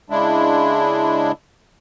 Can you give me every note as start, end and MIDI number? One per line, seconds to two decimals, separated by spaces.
0.10 1.32 49
0.10 1.32 56
0.10 1.32 62
0.10 1.32 64